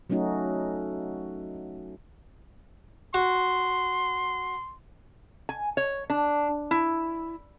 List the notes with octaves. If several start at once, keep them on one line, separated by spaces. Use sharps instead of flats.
F#3 A3 C#4 D#4 F#4
F#4 C6
G#5
C#5
D4
E4